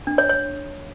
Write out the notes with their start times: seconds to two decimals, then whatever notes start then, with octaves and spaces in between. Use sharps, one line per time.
0.07 D4
0.18 C#5
0.29 C#5